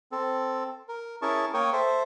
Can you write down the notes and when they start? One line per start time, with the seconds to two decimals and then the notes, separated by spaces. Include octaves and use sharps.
0.12 C4 A4
0.89 A#4
1.22 C#4 E4 G#4 A#4 A5 C#6
1.54 A#3 A#4 C#5 G5 C#6 D#6
1.73 A4 C5 E5